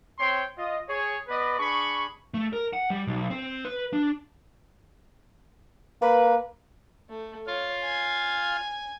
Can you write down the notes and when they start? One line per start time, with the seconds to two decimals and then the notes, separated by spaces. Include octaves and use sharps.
0.19 C4 C#5 G5 C6
0.58 F4 D#5
0.89 G#4 C#5
1.28 B3 B4 D5 D#5 B5
1.59 D4 G#4 B5 C#6
2.34 A3
2.53 A#4
2.73 F#5
2.90 G3
3.07 B1
3.30 C4
3.65 B4
3.93 D4
6.02 A#3 B4
7.09 A3
7.47 F4 C#5 F5
7.84 G#5